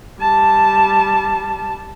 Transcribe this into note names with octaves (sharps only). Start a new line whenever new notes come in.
G3 A5